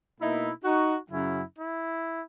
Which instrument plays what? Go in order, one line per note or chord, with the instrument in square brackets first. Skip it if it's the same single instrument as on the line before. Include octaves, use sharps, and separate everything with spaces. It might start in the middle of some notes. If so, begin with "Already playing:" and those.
[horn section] B2 A#3 D#4 E4
D#4 F#4
F#2 C#3 F#3 C#4 E4
E4